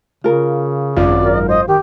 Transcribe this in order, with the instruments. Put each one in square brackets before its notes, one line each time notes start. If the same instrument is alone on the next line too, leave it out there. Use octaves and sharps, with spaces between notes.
[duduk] C#3 [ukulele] F4 A#4
[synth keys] G#1 F#2 [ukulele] F4 [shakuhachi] D5
[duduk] A#4
[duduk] C5 [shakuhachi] D#5
[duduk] D#3 [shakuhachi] G4